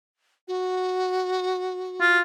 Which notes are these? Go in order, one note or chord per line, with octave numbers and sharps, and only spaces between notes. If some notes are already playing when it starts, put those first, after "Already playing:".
F#4
F4